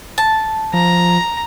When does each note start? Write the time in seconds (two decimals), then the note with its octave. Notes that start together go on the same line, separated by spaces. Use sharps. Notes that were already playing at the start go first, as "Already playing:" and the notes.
0.18 A5
0.73 F3 A#5